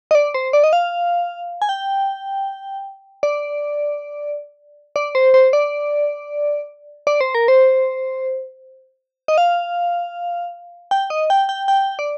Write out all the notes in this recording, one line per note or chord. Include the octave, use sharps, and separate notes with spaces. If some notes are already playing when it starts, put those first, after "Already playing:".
D#5
D5
C5
D5
D#5
F5
G#5
G5
D5
D5
C5
C5
D5
D5
C5
A#4
C5
D#5
F5
G5
D#5
G5
G5
G5
D5